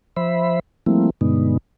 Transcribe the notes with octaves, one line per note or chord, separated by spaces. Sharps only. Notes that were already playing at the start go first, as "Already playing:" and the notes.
F3 C5 E5 B5
F3 G3 A3 A#3 C4 E4
G2 B2 D3 G#3 B3 D#4